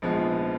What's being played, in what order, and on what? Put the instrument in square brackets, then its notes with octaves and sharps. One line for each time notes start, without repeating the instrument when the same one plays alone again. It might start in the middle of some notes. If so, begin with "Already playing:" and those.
[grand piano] A#1 G#2 F3 G#3 B3